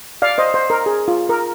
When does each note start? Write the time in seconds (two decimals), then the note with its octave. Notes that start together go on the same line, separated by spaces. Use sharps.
0.22 D5 F5
0.38 C5 D#5
0.54 C5
0.70 A#4
0.86 G#4
1.08 F4
1.29 A#4